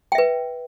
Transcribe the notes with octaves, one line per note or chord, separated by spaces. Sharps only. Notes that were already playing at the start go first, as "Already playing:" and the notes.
B4 E5 G5